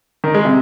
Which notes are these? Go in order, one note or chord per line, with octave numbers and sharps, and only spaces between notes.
D#3
G#3
C3